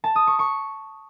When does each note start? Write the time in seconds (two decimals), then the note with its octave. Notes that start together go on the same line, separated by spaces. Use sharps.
0.04 A5
0.16 D#6
0.27 C#6
0.39 C#6